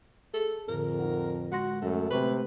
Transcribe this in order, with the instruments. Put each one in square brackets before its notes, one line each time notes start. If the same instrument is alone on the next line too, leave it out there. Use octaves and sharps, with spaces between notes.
[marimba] G#4 [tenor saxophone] A4
[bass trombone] F2 [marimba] A2 D3 [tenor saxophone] A#4
[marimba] D#4 F#5
[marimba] G#3 C6 A#6 [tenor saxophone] F#4
[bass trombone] F#2 [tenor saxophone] A3
[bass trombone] C3 [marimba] A3 C#6 [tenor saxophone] B4